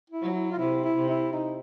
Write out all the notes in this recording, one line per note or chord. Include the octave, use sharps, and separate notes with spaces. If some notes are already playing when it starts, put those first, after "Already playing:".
E4
F#3
E4
F4
C3 E4
E4
C3
E4
D#4